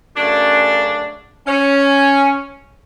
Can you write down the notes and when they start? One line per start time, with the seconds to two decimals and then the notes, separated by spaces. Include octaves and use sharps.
0.16 F#2 C#3 F#3 A3 D4
1.47 C#4